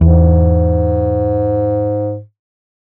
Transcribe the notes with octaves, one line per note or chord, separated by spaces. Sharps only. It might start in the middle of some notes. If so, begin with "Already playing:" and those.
E2 G#2